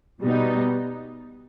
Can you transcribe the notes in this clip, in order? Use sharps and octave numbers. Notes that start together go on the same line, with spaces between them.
B2 G3 B3 D#4